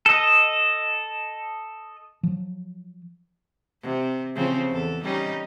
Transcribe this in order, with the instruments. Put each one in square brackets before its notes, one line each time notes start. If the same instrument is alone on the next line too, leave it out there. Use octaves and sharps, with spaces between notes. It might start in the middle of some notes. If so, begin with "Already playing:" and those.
[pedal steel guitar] A4 D#5
[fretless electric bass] F3 F#3
[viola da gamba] C3
C#3 F3 C4
E2 A4
G3 C#4 D#4